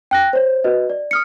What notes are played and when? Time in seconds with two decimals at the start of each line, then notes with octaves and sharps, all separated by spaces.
0.11 G5 F#6 A#6
0.33 C5 C#5
0.64 F#4 B4 D#5
0.90 D5
1.11 D#6 F6 C#7